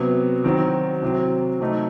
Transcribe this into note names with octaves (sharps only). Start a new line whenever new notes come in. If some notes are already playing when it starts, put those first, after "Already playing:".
Already playing: C3 F#3 B3
D#3 F#3 C4 F#4
C3 F#3 C4
C3 F#3 A3 D#4